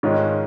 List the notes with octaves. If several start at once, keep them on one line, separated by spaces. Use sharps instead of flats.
G#2 D#3 G#3 C#4 F4